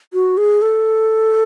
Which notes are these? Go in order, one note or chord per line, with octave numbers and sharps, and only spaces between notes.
F#4
G#4
A4